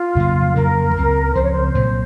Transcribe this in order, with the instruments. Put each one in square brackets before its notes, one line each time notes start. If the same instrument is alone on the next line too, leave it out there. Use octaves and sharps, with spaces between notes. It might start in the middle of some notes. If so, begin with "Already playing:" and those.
Already playing: [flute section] F4
[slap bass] F2 C#3 F#3 A#3
[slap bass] F2 C#3 F#3 A#3 [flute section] A#4
[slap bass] C#2 C#3 F3 C4
[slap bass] C#2 C#3 F3 C4 [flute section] C5
[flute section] C#5
C5
[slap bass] C2 A#2 F#3